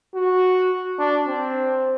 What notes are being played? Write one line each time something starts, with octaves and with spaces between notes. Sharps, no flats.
F#4
D4
C4